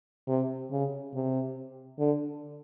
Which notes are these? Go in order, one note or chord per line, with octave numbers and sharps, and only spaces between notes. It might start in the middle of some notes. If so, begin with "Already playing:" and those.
C3
C#3
C3
D3